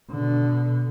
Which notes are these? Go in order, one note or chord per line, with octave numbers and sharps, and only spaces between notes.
B2 D3